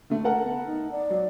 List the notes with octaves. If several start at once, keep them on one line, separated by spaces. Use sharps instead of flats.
D3 A3
A4 A#4 F#5
B3
D#4
D5
F#3